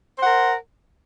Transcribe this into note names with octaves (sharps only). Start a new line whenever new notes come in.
A#4 C5 F#5